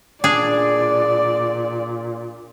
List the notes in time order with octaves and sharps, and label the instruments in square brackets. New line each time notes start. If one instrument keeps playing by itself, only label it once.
[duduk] A#2 [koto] D4 G#4 [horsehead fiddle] D5